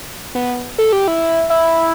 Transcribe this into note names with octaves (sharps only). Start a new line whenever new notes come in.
B3
A4
G4
E4
E4